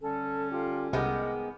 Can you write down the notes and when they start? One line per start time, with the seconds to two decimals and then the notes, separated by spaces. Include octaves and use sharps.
0.02 D3 G3 C#4 A4
0.52 F4 G4 G5
0.93 C2 D#3 G#3 B3 D#5 F#5 D6